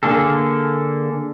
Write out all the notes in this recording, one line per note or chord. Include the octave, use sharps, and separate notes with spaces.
D3 A#3 G#4 A4